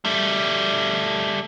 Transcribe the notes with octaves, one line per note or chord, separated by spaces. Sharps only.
G3 A3